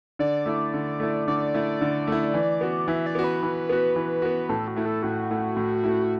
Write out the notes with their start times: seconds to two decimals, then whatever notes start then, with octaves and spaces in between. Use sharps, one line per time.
0.19 D3 D5
0.46 A3 E4
0.74 D3
1.00 A3 E4
1.28 D3 D5
1.55 A3 E4
1.81 D3
2.08 A3 E4
2.34 E3
2.61 B3 F#4
2.88 E3 E5
3.06 D5
3.15 B3 F#4
3.24 B4
3.43 E3
3.69 B3 F#4
3.96 E3
4.22 B3 F#4
4.49 A2 A4
4.68 F#4
4.76 A3 E4
4.86 A4
5.03 A2 F#4
5.31 A3 E4
5.57 A2
5.84 A3 E4